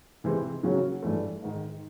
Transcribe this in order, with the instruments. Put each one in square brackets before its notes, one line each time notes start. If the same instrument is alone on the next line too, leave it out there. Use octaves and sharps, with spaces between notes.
[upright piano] C3 E3 G#3 C4
C#3 F#3 A#3 C#4 F#4
G2 E3 A3
G#2 D#3 G#3